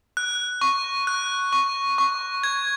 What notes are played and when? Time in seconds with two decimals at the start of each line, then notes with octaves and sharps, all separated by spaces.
0.17 F#6
0.61 C#6
1.07 F#6
1.53 C#6
1.98 C#6
2.44 G#6